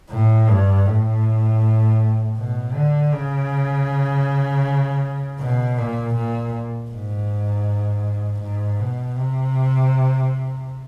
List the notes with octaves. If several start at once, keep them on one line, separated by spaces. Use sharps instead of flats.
A2
G2
A2
B2
D3
C#3
B2
A#2
A#2
G#2
G#2
B2
C3